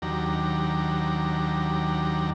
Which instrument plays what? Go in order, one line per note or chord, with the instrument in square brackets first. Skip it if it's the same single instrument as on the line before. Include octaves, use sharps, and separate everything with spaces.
[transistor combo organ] D#2 F#3 D4 G4 A#5